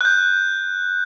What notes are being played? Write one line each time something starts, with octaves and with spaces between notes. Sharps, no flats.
F#6 G6